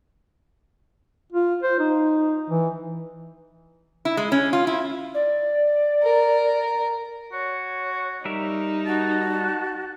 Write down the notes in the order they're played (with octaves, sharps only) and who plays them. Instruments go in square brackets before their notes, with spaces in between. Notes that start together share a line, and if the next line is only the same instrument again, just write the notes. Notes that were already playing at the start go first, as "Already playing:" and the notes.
[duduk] F4
C5
D#4
E3
[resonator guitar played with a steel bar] E4
G#3
C#4
F4
E4
[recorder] D5
[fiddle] A#4
[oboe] F#4 [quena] C#5
[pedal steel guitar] G3 A#4 E5 [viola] D#4
[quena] F#4 [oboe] A5